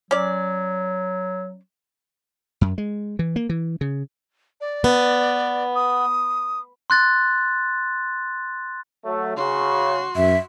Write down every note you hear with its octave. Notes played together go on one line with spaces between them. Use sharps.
F#3 C#4 D5
F#2
G#3
E3
A#3
E3
C#3
D5
B3
D#6
C6 F#6 A6
F#3 A3
C#3 F#4 C6
F#2 E5